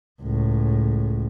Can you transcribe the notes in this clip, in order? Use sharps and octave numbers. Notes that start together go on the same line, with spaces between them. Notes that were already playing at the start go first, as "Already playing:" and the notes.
C#2 A2